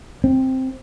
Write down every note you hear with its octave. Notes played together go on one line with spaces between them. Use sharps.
C4